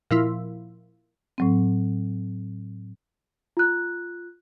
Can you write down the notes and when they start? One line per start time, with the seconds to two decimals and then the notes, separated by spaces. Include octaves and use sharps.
0.11 A#2 F3 E4
1.38 A2 F#3 C4
3.57 F4 F#6